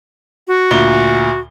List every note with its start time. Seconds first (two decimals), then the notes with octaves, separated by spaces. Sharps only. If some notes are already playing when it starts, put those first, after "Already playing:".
0.48 F#4
0.71 D2 A#2 G7